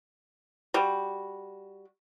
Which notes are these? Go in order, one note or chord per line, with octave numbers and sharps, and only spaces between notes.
G3 F#4